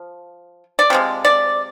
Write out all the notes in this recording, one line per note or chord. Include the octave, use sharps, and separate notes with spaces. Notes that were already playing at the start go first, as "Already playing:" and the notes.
Already playing: F3
D5
C3 F3 G#3
D5